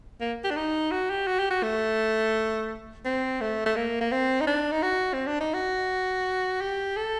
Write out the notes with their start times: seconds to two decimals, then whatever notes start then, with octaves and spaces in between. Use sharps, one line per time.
0.21 A#3
0.44 G4
0.50 D4
0.56 D#4
0.91 F#4
1.10 G4
1.27 F#4
1.39 G4
1.50 F#4
1.63 A3
3.05 C4
3.41 A3
3.66 A3
3.76 A#3
4.01 A#3
4.12 C4
4.41 D#4
4.47 D4
4.71 D#4
4.83 F#4
5.13 C4
5.27 D4
5.40 D#4
5.54 F#4
6.61 G4
6.97 A4